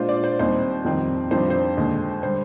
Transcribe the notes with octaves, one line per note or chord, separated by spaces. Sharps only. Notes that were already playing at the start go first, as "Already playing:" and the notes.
Already playing: A#2 G#3 D4 F4 C5
D5
C5
D#2 D#3 G3 C4 D#4 C5
F2 D#3 G3 C4
F2 D#3 G3 D4 F4 C5
C5
D#2 D3 G#3
D3 G3 C5